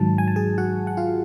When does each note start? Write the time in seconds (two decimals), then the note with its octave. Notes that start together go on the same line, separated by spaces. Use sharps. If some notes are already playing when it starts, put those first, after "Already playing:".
Already playing: G#2 D#3 F#3 A5
0.18 G#5
0.28 A5
0.36 G#4 G#5
0.58 F#4 F#5
0.87 F#5
0.97 F4 F5